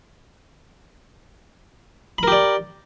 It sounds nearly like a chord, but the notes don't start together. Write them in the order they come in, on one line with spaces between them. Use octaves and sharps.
B5 A#4 G4 D5